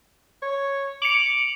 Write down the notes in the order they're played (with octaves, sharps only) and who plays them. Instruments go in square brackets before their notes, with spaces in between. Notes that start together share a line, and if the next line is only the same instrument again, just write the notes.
[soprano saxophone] C#5
[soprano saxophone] D6 [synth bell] C#7 F7 F#7